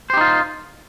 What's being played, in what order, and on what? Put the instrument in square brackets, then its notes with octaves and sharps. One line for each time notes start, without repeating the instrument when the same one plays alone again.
[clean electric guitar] C5
G4
D#4
F4